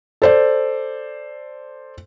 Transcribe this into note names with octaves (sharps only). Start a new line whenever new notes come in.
A4 C5 D5